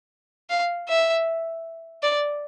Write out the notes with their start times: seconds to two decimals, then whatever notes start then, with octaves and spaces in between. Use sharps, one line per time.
0.50 F5
0.89 E5
2.03 D5